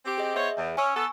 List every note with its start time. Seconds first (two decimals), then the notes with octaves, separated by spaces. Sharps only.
0.06 C4 G4
0.18 G#4 D#5
0.35 B3 C5 C#5 E5
0.57 E2
0.77 C#4 G#5 C#6 E6
0.95 B3 A4